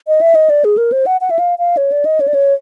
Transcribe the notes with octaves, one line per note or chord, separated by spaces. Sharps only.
D#5
E5
D#5
D5
G#4
A#4
C5
F#5
F#5
E5
F5
F5
C#5
D5
D#5
C#5
D5
C#5